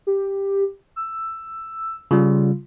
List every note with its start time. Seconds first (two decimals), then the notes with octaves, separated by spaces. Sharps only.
0.07 G4
0.96 E6
2.11 C#3 G3 F4